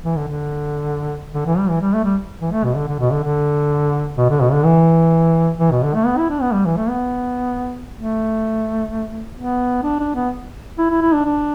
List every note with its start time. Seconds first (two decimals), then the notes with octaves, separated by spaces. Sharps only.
0.04 E3
0.16 D3
0.28 D3
1.34 D3
1.46 E3
1.58 G3
1.69 E3
1.81 G3
1.94 A3
2.04 G3
2.41 E3
2.52 A3
2.64 B2
2.76 D3
2.88 D3
3.00 B2
3.11 D3
3.23 D3
4.17 B2
4.30 D3
4.41 B2
4.52 D3
4.65 E3
5.59 E3
5.71 B2
5.83 D3
5.94 A3
6.06 B3
6.18 E4
6.30 D4
6.41 B3
6.53 G3
6.65 E3
6.77 A3
6.89 B3
7.95 A3
9.37 B3
9.83 D4
9.99 D4
10.15 B3
10.78 E4
10.90 E4
11.02 E4
11.14 D4
11.25 D4